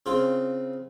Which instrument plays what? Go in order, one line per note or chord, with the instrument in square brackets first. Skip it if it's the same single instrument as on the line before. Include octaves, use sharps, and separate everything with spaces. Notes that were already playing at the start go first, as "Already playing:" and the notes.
[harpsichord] C#3 C4 F4